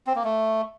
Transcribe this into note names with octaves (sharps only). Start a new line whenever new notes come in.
C4
A#3
A3